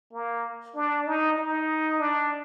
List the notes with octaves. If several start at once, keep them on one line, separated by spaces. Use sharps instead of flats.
A#3
D4
D#4
D#4
D4